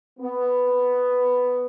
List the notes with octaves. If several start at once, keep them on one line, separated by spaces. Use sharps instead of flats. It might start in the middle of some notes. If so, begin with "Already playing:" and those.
B3